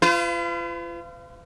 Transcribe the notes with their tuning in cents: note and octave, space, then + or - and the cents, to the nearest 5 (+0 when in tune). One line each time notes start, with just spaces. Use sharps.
F4 -30 B4 +45